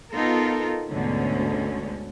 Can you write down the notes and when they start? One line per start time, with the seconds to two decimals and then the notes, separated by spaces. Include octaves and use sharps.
0.13 B3 D#4 F4 A4 A#4
0.88 D2 G#2 B2 D3 C#4